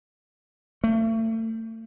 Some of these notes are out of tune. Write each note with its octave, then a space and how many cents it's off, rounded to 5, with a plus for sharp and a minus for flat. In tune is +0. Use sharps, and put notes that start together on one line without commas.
A3 +35